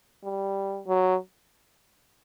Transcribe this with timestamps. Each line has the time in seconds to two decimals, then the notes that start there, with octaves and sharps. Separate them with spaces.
0.24 G3
0.87 F#3